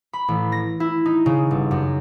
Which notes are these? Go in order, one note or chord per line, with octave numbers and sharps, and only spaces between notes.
B5
A1
A#6
E4
D#4
C#3
G1
F#2